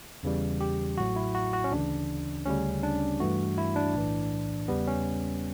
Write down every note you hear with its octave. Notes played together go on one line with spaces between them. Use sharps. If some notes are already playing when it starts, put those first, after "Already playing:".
E2 C#3 E3 G3
G4
A1 A2 F#3 A3 F#4
E4
F#4
F#4
C#4
D2 C#3 E3 D4
D2 C#3 G3 C#4
D4
G2 E3 A3 F#4
E4
D4
B1 A2 E3
E2 C#3 G3 B3
C#4